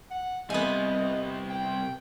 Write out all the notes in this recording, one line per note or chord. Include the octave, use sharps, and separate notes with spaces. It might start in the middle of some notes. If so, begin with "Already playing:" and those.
F#5
C3 G3 B3 D#5 G#5
G5